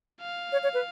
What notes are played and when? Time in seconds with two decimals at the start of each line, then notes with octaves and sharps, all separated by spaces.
0.21 F5
0.52 C#5
0.63 C#5
0.74 B4